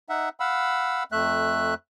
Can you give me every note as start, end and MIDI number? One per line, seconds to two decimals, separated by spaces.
0.09 0.29 63
0.09 0.29 76
0.09 0.29 78
0.40 1.03 77
0.40 1.03 78
0.40 1.03 83
0.40 1.03 88
1.12 1.74 41
1.12 1.74 57
1.12 1.74 76
1.12 1.74 90